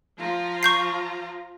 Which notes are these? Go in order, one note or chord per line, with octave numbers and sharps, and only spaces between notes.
F3 F4 A#5
C#6 G6 C7